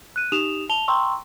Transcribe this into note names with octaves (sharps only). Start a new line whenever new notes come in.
F#6 D#7
D#4 G4 D#6 E7 F7
A5 F7 G7
G5 A#5 C6 C#6 E6